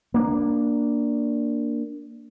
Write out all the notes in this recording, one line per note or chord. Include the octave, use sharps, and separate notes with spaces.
A#3 D4